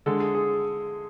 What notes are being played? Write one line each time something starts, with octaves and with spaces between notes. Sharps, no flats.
D3 G#3 A4
G#4
G#4